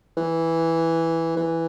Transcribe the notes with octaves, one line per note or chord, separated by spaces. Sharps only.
E3
E3